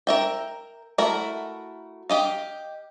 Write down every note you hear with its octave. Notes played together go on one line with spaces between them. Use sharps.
A#4 E5 G5
A3 E4 F#4 A#4
G4 D#5 F5